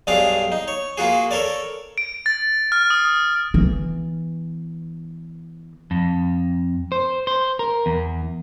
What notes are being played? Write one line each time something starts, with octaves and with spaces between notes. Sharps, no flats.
B1 G2 D4 G#4 F5
D#4
C#5
A#3 F4 F#4 G#4
A4 A#4 C#5 D5
D7
A6
F6
D#6
E3 B3
F2
C5
C5
A#4
E2